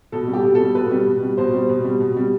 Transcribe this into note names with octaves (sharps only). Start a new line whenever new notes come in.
B2 A4
G3
G4
B2
G3 A4
B2 B4
G3
B2
G3
B2 C5
G3
B2
G3
B2
G3